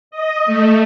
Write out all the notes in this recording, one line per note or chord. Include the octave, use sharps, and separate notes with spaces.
D#5
A3